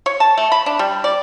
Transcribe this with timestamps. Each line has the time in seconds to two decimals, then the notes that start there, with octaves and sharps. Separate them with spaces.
0.06 C#5
0.20 A5
0.38 A3
0.52 B5
0.66 D4
0.79 G3
1.04 D5